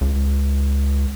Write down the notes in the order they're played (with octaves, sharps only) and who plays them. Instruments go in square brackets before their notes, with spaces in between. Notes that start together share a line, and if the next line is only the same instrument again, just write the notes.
[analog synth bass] C#2